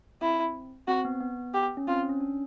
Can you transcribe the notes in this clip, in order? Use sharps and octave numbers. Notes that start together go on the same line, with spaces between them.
C4 E4
C4 F#4
B3
B3
G4
C#4
C4 F4
C#4
C#4
D4